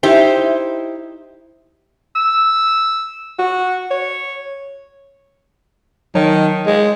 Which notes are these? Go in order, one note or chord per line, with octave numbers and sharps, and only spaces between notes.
D#4 E4 G4 C5
E6
F#4
C#5
D#3 F#3 C#5 A5
G#3